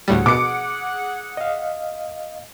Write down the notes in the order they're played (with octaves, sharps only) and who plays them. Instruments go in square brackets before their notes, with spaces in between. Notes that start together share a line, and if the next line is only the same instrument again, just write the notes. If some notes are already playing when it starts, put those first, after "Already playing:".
[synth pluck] D2 A2 G3 [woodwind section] G#4 F#5
[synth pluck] B2 [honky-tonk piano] D6 C#7
[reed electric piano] D#5 F5